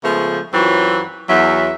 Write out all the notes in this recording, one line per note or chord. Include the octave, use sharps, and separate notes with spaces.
C#3 F3 G#3 A3 B3
F#2 E3 F#3 C4 F4 C#5
E2 F#3 E5